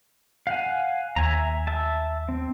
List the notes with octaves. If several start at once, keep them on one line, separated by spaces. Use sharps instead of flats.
F5 F#5 G#5
D#2 E5 G#5 A#5
E5 A5
C4